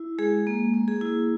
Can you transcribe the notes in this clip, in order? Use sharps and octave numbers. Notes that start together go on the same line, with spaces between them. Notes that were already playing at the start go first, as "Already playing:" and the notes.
Already playing: E4
G#3 G#4
A#3
A#3
G#4
E4